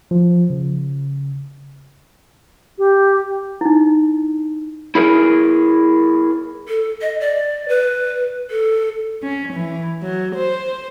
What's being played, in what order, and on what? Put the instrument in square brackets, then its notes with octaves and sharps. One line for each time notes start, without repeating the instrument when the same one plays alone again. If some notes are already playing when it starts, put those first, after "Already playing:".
[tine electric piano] F3
C#3
[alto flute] G4
[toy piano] D#4 E4
[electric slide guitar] E4 G#4 A#4
[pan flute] A4
D#5
D5
B4
A4
[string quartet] C#4
E3
F#3
C5